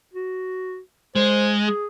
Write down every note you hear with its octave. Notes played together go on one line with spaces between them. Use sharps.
F#4
G#3 C5
G#4